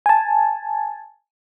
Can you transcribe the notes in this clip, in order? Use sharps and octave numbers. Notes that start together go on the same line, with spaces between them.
G#5 A5